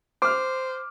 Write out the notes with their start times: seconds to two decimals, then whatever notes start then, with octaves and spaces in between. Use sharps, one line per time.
0.22 C5 D6 F6